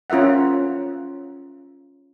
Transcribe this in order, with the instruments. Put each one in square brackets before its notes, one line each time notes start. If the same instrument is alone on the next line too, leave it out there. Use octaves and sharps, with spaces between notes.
[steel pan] C#4 F4 A#4 E5 F#5